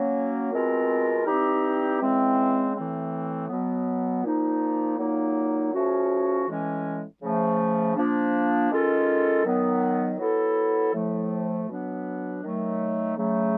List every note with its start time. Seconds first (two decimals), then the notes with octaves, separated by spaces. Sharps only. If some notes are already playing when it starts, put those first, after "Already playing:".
Already playing: F#3 A#3 C#4
0.52 B2 G#3 C4 F4 A#4
1.26 E3 G3 C4 D#4 G4
2.00 C#3 E3 G#3 C4
2.75 A2 E3 A3 C4
3.49 B2 F#3 B3
4.23 A#2 F3 A#3 D#4
4.98 A#2 F#3 A#3 D#4
5.73 C#3 F3 A3 C#4 F#4
6.47 A2 E3 G#3 C#4
7.21 C#3 F3 A3
7.95 F3 A#3 D4
8.70 D#3 G#3 C#4 F4 A4
9.44 D#3 F#3 B3
10.19 F#3 B3 E4 A4
10.93 A2 F3 A3
11.68 B2 F#3 B3 D4
12.42 D#3 F#3 A3
13.17 C#3 F#3 A3